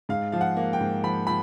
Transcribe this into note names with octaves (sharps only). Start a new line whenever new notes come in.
G#2 F5
F3 F5
F#5
A#3
G5
G#2
F3 B5
F3 B5